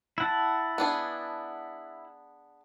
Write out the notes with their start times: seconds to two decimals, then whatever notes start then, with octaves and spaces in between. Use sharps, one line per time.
0.18 E4 F#5 A5
0.78 B3 D4 G#4